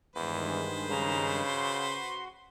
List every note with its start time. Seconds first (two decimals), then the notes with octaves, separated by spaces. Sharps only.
0.16 E2 G2 D#3 G#3 B4 C5
0.91 C#3 A#5
1.47 F#4 C6